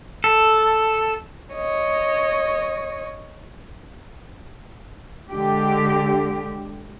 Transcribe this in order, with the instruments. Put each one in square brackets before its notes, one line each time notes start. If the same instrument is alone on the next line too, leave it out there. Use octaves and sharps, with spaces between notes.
[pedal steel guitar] A4
[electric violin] C#5 D#5
[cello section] D3 G#3 G4